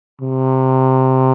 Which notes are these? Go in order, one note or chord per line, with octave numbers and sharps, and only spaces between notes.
C3